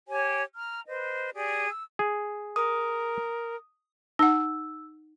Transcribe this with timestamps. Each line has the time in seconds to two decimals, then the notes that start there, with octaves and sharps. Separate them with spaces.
0.08 G4 C#5 G#5
0.55 A#5 F6
0.87 B4 C5 D#5
1.34 G4 G#4 D5
1.70 E6
1.99 G#4
2.56 A#4 D#6
4.19 D#4 F#5 E6